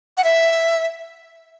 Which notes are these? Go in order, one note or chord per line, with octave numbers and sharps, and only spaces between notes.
F#5
E5